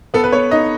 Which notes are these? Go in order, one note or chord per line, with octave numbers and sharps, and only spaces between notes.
B3 A4
B4
B3 C#5
D#4 D#5